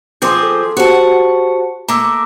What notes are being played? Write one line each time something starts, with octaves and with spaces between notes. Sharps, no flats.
F3 C4 G#4 C6 D6 G6
A4
F#4 G4 C5 F#5 A5
A3 A#3 A#5 D6 E6